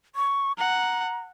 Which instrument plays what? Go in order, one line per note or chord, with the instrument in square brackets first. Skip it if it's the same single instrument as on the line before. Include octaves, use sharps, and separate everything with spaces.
[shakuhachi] C#6
[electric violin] F#5 [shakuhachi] A#5